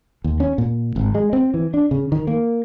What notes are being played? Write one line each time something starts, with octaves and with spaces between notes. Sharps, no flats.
D#2
C#4
A#2
G#1
G#3
C4
E3
D4
C#3
D#3
A#3